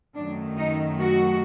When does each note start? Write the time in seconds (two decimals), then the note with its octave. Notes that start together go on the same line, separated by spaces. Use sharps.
0.15 F#2 D#3 A3 D4
0.57 D#4
0.98 F#4